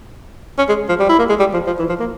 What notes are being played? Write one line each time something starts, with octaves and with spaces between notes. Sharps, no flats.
C#4
G#3
F3
G3
E4
A#3
G#3
G3
F3
F3
E3
F3
A#3